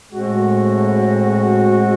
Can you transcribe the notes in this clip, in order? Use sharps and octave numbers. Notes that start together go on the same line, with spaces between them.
A2 G#3 C4 F#4